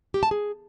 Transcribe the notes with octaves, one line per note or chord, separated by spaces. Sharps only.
G4
A5
G#4